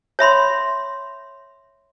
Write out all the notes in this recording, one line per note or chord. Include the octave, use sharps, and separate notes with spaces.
C#5 E5 B5 C6